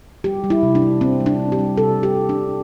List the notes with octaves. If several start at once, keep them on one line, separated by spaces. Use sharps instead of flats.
G3 G4
G3
E4
C3
D4
G3
G3 C4
G3
D4
C3
G4
G3
C3 A4
C3
G4
G3
D4
C3